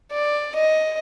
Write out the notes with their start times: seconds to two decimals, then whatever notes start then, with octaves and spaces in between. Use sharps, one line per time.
0.12 D5
0.55 D#5